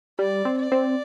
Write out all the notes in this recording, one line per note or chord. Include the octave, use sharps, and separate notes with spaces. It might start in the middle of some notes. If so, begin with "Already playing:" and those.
G3 D5
C4
D5
C4